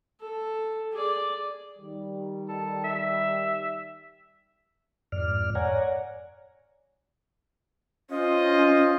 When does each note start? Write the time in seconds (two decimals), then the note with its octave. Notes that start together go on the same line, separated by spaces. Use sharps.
0.21 A4
0.92 G#4 D5
1.79 D#3 G3
2.49 A4
2.84 E5
5.12 F2 G#2 D5 F6
5.55 C#5 D5 F#5 G#5 A#5
8.10 C#4 F4 C5 D#5